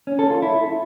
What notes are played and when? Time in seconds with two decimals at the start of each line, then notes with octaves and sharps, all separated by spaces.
0.07 C#4
0.19 A4
0.31 F4
0.42 E4